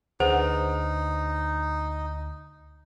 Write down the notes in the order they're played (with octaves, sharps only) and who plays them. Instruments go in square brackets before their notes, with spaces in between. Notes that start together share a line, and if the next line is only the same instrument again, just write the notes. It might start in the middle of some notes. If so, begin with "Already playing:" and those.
[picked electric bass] D2 [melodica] D#4 [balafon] G#4 B4 F#5 [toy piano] C5